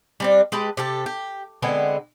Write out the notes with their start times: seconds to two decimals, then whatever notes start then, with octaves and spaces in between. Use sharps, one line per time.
0.20 G3 C4 D4
0.52 G#3 G4 B4 A5
0.77 C3 G4 A4
1.06 G4
1.62 D3 G#3 B3 C4